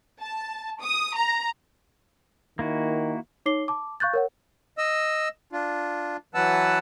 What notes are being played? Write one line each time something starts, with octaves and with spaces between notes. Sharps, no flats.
A5
D#6
A#5
D#3 A#3 E4 F#4
D#4 C#5 D6 C7 G7
A5 D6
F5 C#6 F#6 G6 A6
A#4 C#5 F#5
D#5 E6
D4 F4
E3 F#3 B4 F#5 A5 E6